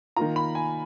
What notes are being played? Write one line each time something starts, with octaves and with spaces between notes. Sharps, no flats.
D#3 A#3 F4 A#5
B5
G#5